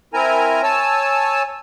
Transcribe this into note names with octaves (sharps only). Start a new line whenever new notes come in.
C4 E4 A#4 G#5 A#5
C#5 G#5 A5 E6